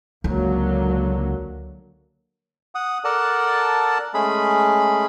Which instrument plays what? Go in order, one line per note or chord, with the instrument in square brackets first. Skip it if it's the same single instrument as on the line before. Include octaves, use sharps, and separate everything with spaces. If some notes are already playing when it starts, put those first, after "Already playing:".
[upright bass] C#2 [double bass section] D3 F#3 A#3
[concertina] F#5 D#6
A4 A#4 D5 F#5 A5
G#3 A3 C#4 G#4 B5